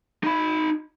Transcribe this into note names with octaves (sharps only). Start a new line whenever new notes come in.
D#4 B5